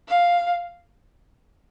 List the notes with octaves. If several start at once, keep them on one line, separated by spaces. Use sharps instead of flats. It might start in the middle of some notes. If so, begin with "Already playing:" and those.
F5